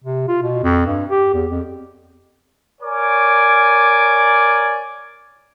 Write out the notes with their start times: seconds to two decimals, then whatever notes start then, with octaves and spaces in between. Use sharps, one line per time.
0.04 C3
0.28 F4
0.43 B2
0.63 F2
0.86 G2
1.09 G4
1.34 E2
1.51 F2
2.81 A#4 C#5 D5 G#5 D6